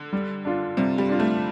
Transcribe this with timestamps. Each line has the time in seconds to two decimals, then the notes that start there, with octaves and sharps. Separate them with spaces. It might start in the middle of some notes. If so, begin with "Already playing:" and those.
Already playing: D3
0.13 G3
0.45 D4 F4
0.77 C3 G3
0.98 G3
1.09 D4 F4
1.20 A3